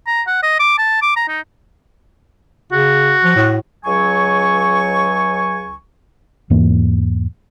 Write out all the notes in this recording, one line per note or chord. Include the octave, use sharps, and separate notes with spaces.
A#5
F#5
D#5
D6
A5
D6
A#5
D#4
C#3 F#4
F3
A2
C#2 F#3 G#5 C#6
E2 G#2 E3 A#3